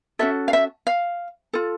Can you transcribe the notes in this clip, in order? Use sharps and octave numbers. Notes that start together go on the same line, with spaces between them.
C#4 F#4 A4 E5
F5
E5
F5
F4 A4